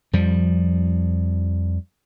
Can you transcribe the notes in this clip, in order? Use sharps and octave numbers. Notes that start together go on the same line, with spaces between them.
F2 F3 G3